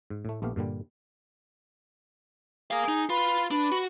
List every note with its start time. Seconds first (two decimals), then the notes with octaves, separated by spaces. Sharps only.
0.10 G#2
0.25 A2 A3
0.42 A#1 A3 B3 G4 F5
0.56 G2 A#2 D3 G3
2.71 G#4 A#4 F5
2.89 D#4
3.10 F4 B4
3.51 D4 B4
3.72 F#4